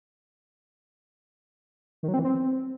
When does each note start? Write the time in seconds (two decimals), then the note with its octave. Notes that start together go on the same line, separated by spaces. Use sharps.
2.03 D#3
2.08 F#3
2.14 C4
2.19 E3
2.25 C4